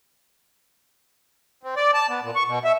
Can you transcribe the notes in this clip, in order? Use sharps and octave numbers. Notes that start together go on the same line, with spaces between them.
C4
D5
A5
B3
A#2
C#6
B2
E5